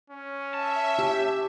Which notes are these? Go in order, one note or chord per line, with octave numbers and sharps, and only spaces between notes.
C#4
E5 A5
G4